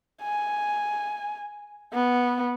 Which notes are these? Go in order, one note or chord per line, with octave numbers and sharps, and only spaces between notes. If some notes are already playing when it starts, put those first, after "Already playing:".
G#5
B3